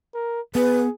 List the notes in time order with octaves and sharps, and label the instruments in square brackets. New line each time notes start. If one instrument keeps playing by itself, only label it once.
[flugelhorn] A#4
[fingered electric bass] B3 [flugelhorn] G#4 [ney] B4